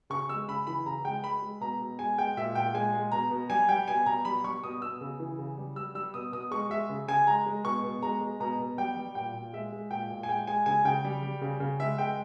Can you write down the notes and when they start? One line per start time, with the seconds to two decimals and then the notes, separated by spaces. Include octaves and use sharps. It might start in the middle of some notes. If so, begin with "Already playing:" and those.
0.10 C#3 C#6
0.29 G#3 E6
0.48 C#3 B5
0.67 E3 B5
0.86 C#3 A#5
1.05 G#3 G5
1.23 G#3 B5
1.42 G#3
1.61 B2 A#5
1.80 B2
1.99 G#3 G#5
2.18 G#3 G5
2.37 A#2 E5
2.55 A#2 G5
2.74 G#3 G#5
2.93 G#3
3.12 B2 A#5
3.31 B2
3.50 G3 G#5
3.69 G3 G5
3.88 B2 G#5
4.06 B2 A#5
4.25 G3 B5
4.44 G3 C#6
4.63 B2 D#6
4.81 B2 E6
5.01 C#3
5.20 E3
5.39 C#3
5.57 G3
5.76 G3 E6
5.95 G3 E6
6.14 B2 D#6
6.32 B2 D#6
6.51 G#3 C#6
6.70 G#3 E5
6.90 C#3
7.08 C#3 G#5
7.27 G#3 A#5
7.46 G#3
7.64 B2 C#6
7.83 B2
8.03 G#3 A#5
8.21 G#3
8.40 B2 A#5
8.59 B2
8.78 G3 G5
8.97 G3
9.15 A#2 G5
9.34 A#2
9.53 G#3 E5
9.73 G#3
9.90 A#2 G5
10.10 A#2
10.23 G#5
10.29 G#3 G5
10.47 G#3 G#5
10.66 C#3 G#5
10.85 C#3 G5
11.05 G3
11.23 G3
11.41 C#3
11.60 C#3
11.80 G#3 E5
11.98 G#3 G5